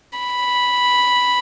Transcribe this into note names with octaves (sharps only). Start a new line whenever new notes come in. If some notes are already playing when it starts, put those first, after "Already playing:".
B5